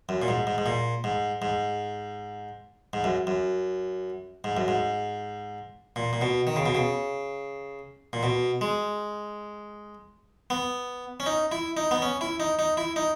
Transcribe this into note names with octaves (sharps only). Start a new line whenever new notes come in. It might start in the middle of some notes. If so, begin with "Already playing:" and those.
F#2
A#2
G#2
G#2
G#2
A#2
G#2
G#2
G#2
F#2
F#2
G#2
F#2
G#2
A#2
A#2
B2
D#3
C#3
B2
C#3
A#2
B2
G#3
B3
C#4
D#4
E4
D#4
B3
C#4
E4
D#4
D#4
E4
D#4